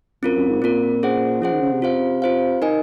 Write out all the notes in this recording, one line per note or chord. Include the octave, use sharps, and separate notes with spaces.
F#2 C4 F4 A#4
F#2
G#2
A#2 C4 F4 A#4
C#4 G#4 C5 F#5
F3 C#4 G#4 C5 F#5
D#3
C#3
C3
F4 C5 F5
F4 C5 F5
D#4 A#4 D#5 G#5